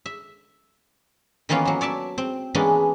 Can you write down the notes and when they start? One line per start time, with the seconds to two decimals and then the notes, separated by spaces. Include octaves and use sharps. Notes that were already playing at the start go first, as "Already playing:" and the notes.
0.06 E5
1.49 D#3 E3 A#3 B3 C#4 F4
1.65 F3 F#3
1.81 C#5 D5 E5 A5
2.18 C4
2.55 E3 G#3 A#3 B3 C#4 D4